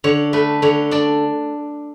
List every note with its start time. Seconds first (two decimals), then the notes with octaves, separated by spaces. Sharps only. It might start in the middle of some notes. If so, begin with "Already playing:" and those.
0.04 D3 C#5
0.33 A3 B4
0.62 D3 C#5
0.91 D4 D5